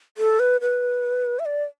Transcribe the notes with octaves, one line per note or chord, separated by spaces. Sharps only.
A4
B4
B4
E5
D5